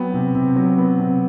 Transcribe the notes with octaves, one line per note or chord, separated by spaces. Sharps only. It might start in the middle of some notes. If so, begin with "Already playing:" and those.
Already playing: F#3 B3 G5
C3
C3
F#3
B3
C3